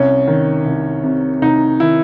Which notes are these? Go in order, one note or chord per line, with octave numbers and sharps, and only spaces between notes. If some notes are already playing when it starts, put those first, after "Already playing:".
Already playing: C2 C#4
D#3
C2
C3
C2 D#4
D#3 E4